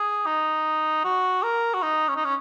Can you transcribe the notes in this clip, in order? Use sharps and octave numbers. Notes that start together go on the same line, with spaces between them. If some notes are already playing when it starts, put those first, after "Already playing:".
Already playing: G#4
D#4
F#4
A#4
F#4
D#4
C#4
D#4
C#4